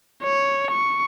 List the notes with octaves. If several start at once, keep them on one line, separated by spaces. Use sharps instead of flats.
C#5
C#6